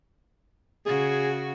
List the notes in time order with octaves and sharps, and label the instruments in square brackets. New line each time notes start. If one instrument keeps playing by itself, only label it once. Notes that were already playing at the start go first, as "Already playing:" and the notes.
[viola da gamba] C#3 F#4 [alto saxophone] G#4